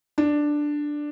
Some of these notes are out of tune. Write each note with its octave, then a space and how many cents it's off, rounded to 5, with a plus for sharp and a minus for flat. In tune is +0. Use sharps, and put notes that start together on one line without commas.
D4 +5